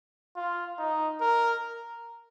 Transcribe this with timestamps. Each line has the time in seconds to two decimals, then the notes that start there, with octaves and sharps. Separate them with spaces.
0.36 F4
0.78 D#4
1.21 A#4